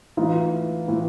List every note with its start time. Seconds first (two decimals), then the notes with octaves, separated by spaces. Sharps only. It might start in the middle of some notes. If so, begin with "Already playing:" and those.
0.17 A2 E3 D#4 F4
0.88 A2 E3